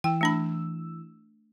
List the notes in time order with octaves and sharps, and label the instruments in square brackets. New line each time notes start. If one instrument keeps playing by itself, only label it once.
[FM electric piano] E3 E6 [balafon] G5
[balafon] A3 D4 B5